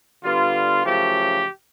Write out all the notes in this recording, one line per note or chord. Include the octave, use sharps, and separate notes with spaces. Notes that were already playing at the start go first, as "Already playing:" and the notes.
D3 G3 B3 F4
F#2 C#3 F3 A3 G4